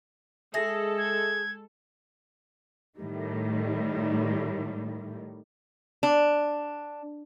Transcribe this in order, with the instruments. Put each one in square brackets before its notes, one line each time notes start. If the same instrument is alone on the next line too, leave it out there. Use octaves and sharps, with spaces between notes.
[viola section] G#3 A4 [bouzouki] G#4 [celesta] E5 A#6
[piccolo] G#6
[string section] A2 D#3 G3
[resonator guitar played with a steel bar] D4